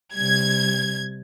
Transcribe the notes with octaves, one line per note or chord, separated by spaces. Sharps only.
C3 G3 G#6